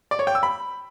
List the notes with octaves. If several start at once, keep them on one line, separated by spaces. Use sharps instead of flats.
D5
C#5
G5
E6
B5